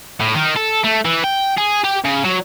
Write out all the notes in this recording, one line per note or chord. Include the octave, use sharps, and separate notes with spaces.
A2
D#3
A4
A3
E3
G5
G#4
G4
C#3
F#3